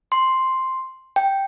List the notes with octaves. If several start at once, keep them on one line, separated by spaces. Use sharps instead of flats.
C6
G5